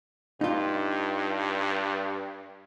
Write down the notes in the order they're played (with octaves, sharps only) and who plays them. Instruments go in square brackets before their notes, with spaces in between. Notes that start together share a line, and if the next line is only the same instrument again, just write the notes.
[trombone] G2 [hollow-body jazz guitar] D#4 F4